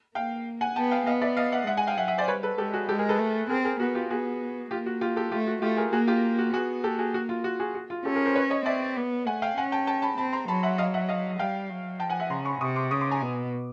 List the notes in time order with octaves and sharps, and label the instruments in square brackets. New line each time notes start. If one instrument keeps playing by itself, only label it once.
[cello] A#3 [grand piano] F5 G5
[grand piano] F#5 G#5
[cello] B3 [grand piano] G5 A5
[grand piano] F5 G5
[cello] B3 [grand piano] D#5 F5
[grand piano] D5 E5
D#5 F5
E5 F#5
[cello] G#3 [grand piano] E5 F#5
[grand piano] F#5 G#5
F5 G5
[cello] F#3 [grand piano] E5 F#5
[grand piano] E5 F#5
C5 D5
[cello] G3 [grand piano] B4 C#5
[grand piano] A4 B4
[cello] G#3 [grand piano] G4 A4
[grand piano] F#4 G#4
[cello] G#3 [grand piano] G4 A4
[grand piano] G#4 A#4
A4 B4
[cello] A3
[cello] C4 [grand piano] G#4 A#4
[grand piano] G#4 A#4
[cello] B3 [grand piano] F#4
[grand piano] F4 G4
[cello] B3 [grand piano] F#4 G#4
[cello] A#3 [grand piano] F4 G4
[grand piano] F#4
F4 G4
G4 A4
[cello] A3 [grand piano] F4 G4
[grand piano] F#4
[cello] A3 [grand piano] F4 G4
[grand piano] G#4 A#4
[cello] A#3 [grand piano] F#4 G#4
[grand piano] F4 G4
F#4
[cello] B3 [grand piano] F#4 G#4
[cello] A#3 [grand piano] G4 A4
[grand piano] F#4 G#4
F#4
F4
F#4
F#4 G#4
F#4
F4
[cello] C#4 [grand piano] G4 A4
[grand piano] G#4 A#4
A#4 C5
B4 C#5
C#5 D#5
[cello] C4 [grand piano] D5 E5
[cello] B3
[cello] A3 [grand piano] F#5 G#5
[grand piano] F5 G5
[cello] C#4 [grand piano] F#5 G#5
[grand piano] G5 A5
G5 A5
A5 B5
[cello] C4 [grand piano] A5 B5
[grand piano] A#5 C6
[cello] F#3 [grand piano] A5 B5
[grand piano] E5 F#5
D#5 F5
E5 F#5
D#5 F5
[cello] G3 [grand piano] F5 G5
[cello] F#3
[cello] F3 [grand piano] G5 A5
[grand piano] F#5 G#5
E5 F#5
[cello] C#3 [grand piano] A#5 C6
[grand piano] B5 C#6
[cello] C3 [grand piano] C#6 D#6
[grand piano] C6 D6
[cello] C#3 [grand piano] C#6 D#6
[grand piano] C6 D6
G#5 A#5
[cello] B2